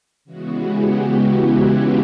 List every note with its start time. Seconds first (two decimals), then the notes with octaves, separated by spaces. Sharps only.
0.25 C#3 E3 G#3 B3 F#4
0.57 G4
0.88 F#4
1.19 E4
1.51 F4